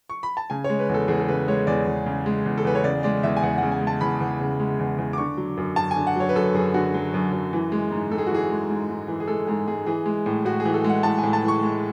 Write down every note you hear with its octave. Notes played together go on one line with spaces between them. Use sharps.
C#6
B5
A5
C#3 G#5
C#5
G#3
B4
E2
A4
E2 G#4
A4
C#3 B4
G#3 C#5
E2 D5
E2
C#3
G#3
E2
A4
E2 B4
C#5
C#3 D5
G#3 D5
E2 E5
G#5
E2 F#5
C#3 F#5
G#5
G#3
A5
E2 B5
E2
C#3
G#3
E2
E2
D6
D3 C#6
F#3
F#2
F#2 A5
G#5
D3
F#5
F#3 C#5
B4
F#2 A4
F#2 G#4
D3 F#4
F#3
F#2
F#2
E3
G#3
G#2
G#2 A4
G#4
F#4
E3 G#4
G#3
G#2
G#2
E3
G#4
G#3 A4
G#2 G#4
G#2 G#4
E3 G#4
G#3
A2
A2 F#4
G#4
E3
A4
G#3
F#5
A2 A5
A2 G#5
A5
E3
C#6
G#3